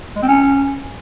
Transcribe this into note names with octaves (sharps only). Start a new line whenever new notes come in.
G#3
C4
C#4